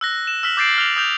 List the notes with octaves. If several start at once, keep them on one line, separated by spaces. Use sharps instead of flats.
E6 F#6 A#6
E7
E6 F6 B6 E7 F#7
D6 G6 A6 C7 D7 F#7
F6 F7
D#6 F6 G6 F7